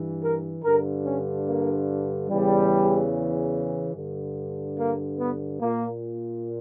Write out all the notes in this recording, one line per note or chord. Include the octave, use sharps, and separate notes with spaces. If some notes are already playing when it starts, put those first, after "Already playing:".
Already playing: G2 E3
A#4
G2 D3 A#4
C#4
A#3
E2 C#3 E3 G3
G2 D3
A#3
B3
A#2 A#3